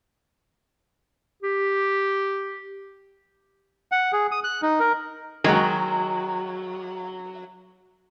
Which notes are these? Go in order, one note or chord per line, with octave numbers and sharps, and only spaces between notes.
G4
F#5
G#4
D#6
F#6
D#4
A#4
D#3 F#3 G#3 F#4